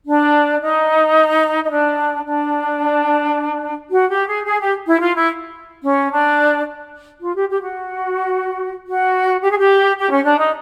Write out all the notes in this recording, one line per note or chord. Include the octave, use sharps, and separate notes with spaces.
D4
D#4
D#4
D4
D4
F#4
G4
G#4
G#4
G4
E4
F4
E4
C#4
D4
F4
G4
G4
F#4
F#4
G4
G#4
G4
G4
C#4
D4
D#4